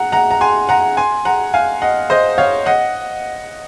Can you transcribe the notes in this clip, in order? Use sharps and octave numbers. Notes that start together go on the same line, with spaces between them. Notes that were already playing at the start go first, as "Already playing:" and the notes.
Already playing: F#5 A#5
F#5 A#5
A#5
G#5 C6
F#5 A#5
G#5 C6
F#5 A#5
F5 G#5
D#5 F#5
C5 D#5
C#5 F5
D#5 F#5